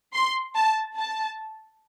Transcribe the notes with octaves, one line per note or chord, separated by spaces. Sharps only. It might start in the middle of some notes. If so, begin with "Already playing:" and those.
C6
A5
A5